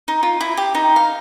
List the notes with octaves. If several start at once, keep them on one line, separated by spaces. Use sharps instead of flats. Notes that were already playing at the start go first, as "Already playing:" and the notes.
D#4
F4
E4
G4
D#4
F5